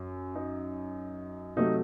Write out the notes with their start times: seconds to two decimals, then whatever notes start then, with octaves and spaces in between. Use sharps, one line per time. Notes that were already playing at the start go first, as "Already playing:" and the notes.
Already playing: F#2
0.35 D#4
1.56 C3 F#3 A3 D#4